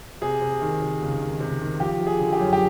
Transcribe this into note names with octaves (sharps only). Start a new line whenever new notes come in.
C3 G#4
C3
D#3
C3
C#2
D#3
C3
D#3
F3 G4
F3
G#4
D3
G4
F#2
G4